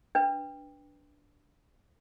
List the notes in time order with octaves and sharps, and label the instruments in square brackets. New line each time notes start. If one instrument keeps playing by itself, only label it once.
[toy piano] D4 B4